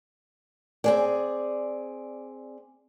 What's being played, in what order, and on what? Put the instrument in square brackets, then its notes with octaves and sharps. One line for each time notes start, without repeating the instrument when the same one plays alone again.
[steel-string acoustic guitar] C4 G#4 D5